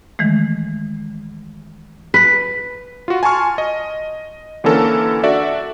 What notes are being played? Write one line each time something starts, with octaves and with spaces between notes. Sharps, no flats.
D#3 E3 G#3 A3
B4
F4 F#4
G#5 A5 C6 C#6 F6
D#5
D3 E3 A#3 C#4 A4 A#4
D4 F#4 A4 D5 E5